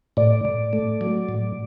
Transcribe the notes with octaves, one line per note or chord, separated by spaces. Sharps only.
A2 D5
A2
A3
F#3
A2